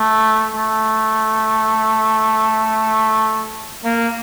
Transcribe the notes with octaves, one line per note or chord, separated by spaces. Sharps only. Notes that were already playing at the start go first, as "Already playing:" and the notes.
Already playing: A3
A3
A#3